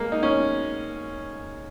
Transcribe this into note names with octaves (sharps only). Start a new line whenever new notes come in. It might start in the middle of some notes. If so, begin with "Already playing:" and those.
Already playing: G#3 A#3
D#4
C#4